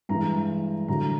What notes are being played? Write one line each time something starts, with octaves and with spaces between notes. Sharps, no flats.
G2 E3 G#3 A#5
G2 D3 F#3 A#5